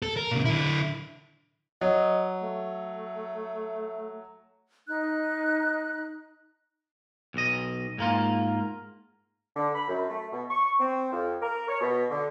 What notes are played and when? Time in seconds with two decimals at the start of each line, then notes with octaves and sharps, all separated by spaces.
0.02 A4
0.17 A#4
0.31 A#2 C#3
0.45 D3 E4
1.81 F#3 D#5
2.43 A3
4.87 D#4 F#6
7.34 B1 D#5
7.98 G#2 A#3 F4
9.56 D3
9.74 B5
9.89 F#2
10.10 A3
10.31 B2
10.49 C#6
10.79 C4
11.12 F2
11.41 A#4
11.69 C#5
11.81 B2
12.11 D3